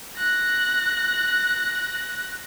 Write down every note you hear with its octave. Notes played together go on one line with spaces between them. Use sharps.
F#6 A#6